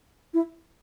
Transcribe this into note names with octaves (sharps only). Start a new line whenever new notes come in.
E4